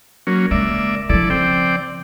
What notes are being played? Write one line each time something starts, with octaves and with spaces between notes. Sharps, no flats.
F#3 A#3 C#4
C#3 G#3 A#3 D5 E5
C#3 F3 E4 A4 D5
C4 D5 G5